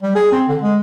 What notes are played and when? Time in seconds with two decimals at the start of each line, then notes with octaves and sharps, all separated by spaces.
0.02 G3
0.15 G#4
0.32 C4
0.49 D3
0.62 G#3